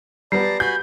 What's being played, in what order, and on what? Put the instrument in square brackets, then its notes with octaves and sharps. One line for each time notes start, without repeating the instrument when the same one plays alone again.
[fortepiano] G3 B3 [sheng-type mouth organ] D5 A5 A#5 [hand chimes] C7
[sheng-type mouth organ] F#4 G#5 B5 [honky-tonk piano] G6